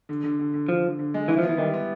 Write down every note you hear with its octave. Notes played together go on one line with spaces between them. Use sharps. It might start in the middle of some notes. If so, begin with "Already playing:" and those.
D3
D3
D3
D3
D3 F3
D3
D3
G#3
E3 E4
F3
B3
E3
D#3 G3
B3